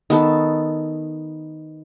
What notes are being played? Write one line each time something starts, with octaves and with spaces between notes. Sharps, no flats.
D#3 B3 A4